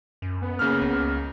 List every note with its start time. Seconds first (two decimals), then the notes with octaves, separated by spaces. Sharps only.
0.22 F#2
0.42 B3
0.59 C#3 A#3 F6
0.82 C#2